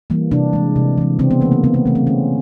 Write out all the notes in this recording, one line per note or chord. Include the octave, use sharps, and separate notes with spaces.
E3 G3 A#3
C3 D4
E3 G#3
C3
E3 G#3
C#3 C4
B3
E3 A3 A#3
A#3
C#3 B3
A#3
E3 A3
C4
D3 C#4